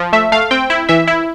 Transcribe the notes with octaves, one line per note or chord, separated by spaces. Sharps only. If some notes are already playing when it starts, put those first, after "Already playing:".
Already playing: F3
A3 E5
A3 F5
C4 G5
E4
E3 E5
E4